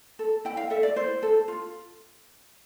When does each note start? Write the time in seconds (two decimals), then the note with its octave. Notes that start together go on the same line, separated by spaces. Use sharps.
0.19 A4
0.45 E4 G5
0.57 F5
0.70 A4 E5
0.83 D5
0.96 E4 C5
1.23 A4
1.48 F4